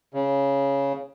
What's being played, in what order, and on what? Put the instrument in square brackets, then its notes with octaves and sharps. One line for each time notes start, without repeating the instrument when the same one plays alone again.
[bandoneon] C#3